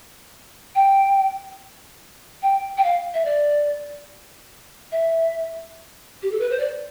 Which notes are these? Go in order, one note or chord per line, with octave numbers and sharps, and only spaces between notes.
G5
G5
G5
F5
E5
D5
E5
G4
A4
B4
C5
D5